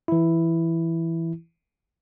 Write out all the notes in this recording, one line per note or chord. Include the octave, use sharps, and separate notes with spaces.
E3 E4